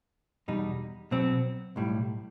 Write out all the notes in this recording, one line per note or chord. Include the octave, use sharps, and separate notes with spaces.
E2 B2 G3 D#4
B1 B2 F#3 C4
B1 A2 G3